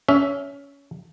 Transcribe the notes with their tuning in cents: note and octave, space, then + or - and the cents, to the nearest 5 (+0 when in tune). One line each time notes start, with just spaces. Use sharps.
C#4 +20 E5 +0